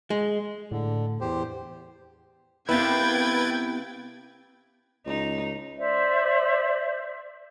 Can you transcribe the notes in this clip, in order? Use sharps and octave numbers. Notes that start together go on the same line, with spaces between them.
G#3
A2 D3
E2 G4 C5
C3 B3 E4 B4 F5 G5 G#6 A6
C#2 D#4
C5 D5 E5